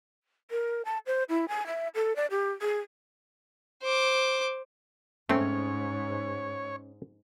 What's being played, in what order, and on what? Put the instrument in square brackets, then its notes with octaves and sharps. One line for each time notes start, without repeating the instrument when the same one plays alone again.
[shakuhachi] A#4
A5
C5
E4
G#5
E5
A4
D5
G4
G#4
[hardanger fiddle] C5 D6
[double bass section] G#2 [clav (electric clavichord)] A3 C4 [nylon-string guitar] C#4 [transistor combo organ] C#5